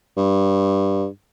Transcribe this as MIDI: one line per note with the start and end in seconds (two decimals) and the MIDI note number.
0.17 1.07 43